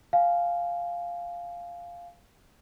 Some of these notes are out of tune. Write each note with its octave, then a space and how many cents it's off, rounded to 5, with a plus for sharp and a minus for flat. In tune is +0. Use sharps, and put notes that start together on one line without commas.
F5 +0 G#5 +25